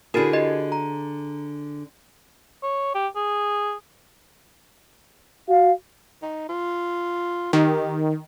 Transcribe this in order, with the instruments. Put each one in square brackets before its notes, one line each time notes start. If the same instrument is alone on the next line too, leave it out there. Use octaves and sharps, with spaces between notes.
[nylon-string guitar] D3 G#4 [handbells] E4 F#4 A#4
[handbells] F#4 G4 D#5
A#5
[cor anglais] C#5
G4
G#4
[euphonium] F#4 [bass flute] F5
[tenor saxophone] D#4
F4
[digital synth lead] D#3 [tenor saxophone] G4